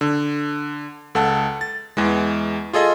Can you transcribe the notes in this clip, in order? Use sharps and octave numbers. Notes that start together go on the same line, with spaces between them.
D3
C#2 A4 F#5 A5
A6
E2 E3 G#3
F4 G#4 A4 D#5